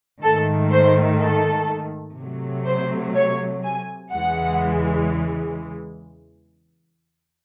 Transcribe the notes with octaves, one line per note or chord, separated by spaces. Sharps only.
G#2 D#3 A3 A4
C5
A4
C3 F#3 A3
C5
C#5
G#5
E2 C#3 E3 G#3 F#5